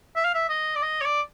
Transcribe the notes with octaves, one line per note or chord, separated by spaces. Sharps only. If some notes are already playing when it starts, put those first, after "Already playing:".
E5
F5
E5
D#5
D5
D#5
C#5
D5